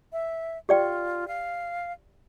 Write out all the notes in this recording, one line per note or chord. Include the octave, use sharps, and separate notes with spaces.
E5
F4 G4 D5 G5
F5